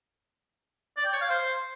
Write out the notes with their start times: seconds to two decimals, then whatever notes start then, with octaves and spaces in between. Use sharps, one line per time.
0.97 D5
1.05 G5
1.13 C#5
1.21 F5
1.30 C5